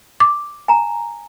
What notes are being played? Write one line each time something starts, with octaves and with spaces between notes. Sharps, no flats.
D6
G#5 A#5